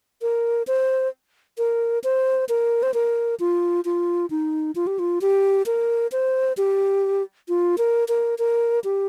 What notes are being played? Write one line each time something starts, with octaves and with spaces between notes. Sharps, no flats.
A#4
C5
A#4
C5
A#4
C5
A#4
F4
F4
D#4
F4
G4
F4
G4
A#4
C5
G4
F4
A#4
A#4
A#4
G4